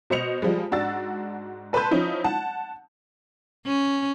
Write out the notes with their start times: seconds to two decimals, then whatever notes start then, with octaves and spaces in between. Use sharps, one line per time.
0.10 B2 C5 D#5 C#7 F7
0.42 F3 G3 G#3
0.72 G#2 D4 F#4 E6 A6
1.73 A4 B4 A5 B5 C6 G6
1.91 F3 C#4 D#4 E4
2.24 F#5 A5
3.66 C#4